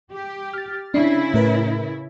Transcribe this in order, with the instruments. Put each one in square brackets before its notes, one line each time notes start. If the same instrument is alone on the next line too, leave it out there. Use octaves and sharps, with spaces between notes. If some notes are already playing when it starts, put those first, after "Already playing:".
[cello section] G4
[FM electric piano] F6 A6
[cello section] C#3 E4 [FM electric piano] D4 C7
[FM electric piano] A2 A#4 B4